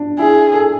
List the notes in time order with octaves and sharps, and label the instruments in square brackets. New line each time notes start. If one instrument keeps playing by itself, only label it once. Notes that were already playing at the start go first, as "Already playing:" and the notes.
Already playing: [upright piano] D4
[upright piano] E4 [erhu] G#4
[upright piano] A4